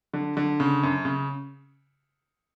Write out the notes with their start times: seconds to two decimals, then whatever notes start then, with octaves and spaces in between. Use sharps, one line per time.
0.14 D3
0.37 D3
0.60 C#3
0.83 F#2
1.05 C#3